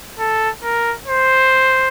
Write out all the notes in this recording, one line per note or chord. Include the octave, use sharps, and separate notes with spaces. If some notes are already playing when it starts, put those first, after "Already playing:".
A4
A#4
C5